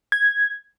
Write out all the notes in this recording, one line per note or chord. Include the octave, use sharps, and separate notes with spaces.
G#6